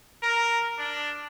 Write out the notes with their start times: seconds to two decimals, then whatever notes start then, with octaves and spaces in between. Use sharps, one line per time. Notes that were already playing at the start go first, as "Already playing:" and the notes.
0.23 A#4
0.78 D4